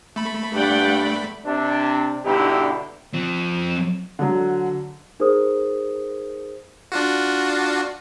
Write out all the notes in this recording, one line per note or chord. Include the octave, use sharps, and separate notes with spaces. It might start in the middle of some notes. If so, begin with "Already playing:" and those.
A3 B5
G2 D5 F#5 G5
C3 D4
G2 B2 D3 D#4 E4 G4
F3 C4
D3 F#3
D#4 G#4 A#4 C5 D#6
D4 F4 F#4